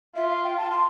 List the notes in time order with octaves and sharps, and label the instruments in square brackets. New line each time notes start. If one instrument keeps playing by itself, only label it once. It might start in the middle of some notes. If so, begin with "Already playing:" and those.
[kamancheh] F4 [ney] E5
[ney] F5
G5
A5
C6